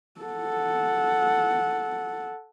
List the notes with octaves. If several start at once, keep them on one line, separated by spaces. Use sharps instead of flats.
A4 F#5